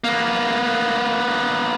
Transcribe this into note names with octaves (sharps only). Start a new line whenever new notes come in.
A#3 B3